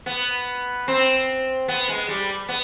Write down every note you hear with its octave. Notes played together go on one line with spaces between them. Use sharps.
B3
C4
B3
G#3
G3
B3